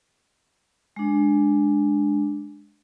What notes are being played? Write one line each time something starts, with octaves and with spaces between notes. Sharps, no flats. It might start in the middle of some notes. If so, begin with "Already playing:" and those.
G#3 D4